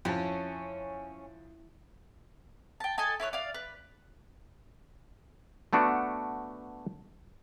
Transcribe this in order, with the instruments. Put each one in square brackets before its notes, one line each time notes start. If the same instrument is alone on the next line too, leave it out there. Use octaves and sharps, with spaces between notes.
[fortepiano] F2 [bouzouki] C#4 [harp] E4 A5
[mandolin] G5 A5
A4 D#5 G#5 A5
E4 B4 C#5 F#6
D5 F5
B4
[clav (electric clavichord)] A3 B3 D4 F#4